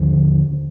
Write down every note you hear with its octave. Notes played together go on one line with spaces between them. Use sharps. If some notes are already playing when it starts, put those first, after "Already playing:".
Already playing: D#2 D3 F3